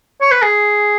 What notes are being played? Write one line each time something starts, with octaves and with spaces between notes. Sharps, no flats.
C#5
B4
G#4